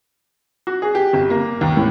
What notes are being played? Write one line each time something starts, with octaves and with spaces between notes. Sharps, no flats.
F#4
G#4
G4
G1
A#3
D#2
A2